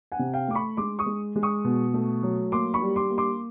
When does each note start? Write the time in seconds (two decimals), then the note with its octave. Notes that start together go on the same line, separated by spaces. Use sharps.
0.12 F#5 G#5
0.19 C3
0.33 F5 G5
0.48 A3 D6
0.55 B5 C#6
0.77 G#3 C6 D6
0.99 C#6 D#6
1.06 G#3
1.36 G#3
1.43 C#6 D#6
1.64 B2
1.94 A3
2.23 F#3
2.52 A#3 C6 D6
2.74 B5 C#6
2.82 G3
2.96 C6 D6
3.10 A#3
3.18 C6 D6